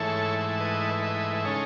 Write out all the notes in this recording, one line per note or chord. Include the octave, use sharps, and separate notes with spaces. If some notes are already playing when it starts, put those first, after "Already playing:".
Already playing: G#2 E3 A3 E4 A4 C#5
B4 D#5
B4 D#5
C#3 G#3 D#4 A4 C#5